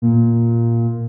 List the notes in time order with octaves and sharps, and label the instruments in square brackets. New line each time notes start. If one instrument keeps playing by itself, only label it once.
[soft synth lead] A#2